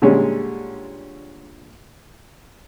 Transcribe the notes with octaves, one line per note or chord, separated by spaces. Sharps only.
A#2 D3 G3 G#3 C#4